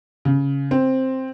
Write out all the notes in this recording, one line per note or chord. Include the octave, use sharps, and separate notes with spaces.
C#3
C4